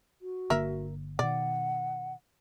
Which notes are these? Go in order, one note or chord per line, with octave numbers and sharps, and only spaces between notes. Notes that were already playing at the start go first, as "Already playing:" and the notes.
F#4
G1 D3 A#3 A#4 E5
B2 D#3 D5 F#5